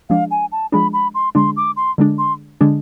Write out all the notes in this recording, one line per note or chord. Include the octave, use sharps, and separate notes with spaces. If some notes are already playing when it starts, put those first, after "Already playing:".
F3 G#3 D4 F5
G#5
A5
F3 G#3 D4 B5
B5
C6
D3 G#3 D4 C6
D6
C6
D3 G#3 D4
C6
D3 G#3 D4